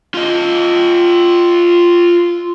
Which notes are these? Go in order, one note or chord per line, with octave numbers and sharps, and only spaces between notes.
F4 D#5